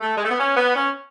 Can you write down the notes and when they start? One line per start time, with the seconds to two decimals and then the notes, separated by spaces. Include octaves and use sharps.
0.01 A3
0.16 G#3
0.24 A3
0.30 B3
0.38 C#4
0.56 B3
0.75 C#4